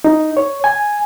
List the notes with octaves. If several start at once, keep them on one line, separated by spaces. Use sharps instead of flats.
D#4
C#5
G#5